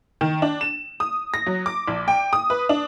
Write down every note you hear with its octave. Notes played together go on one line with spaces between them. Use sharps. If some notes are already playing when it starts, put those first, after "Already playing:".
D#3
D4
E7
D#6
A#6
F#3
D6
A#1
G5
D#6
B4
D4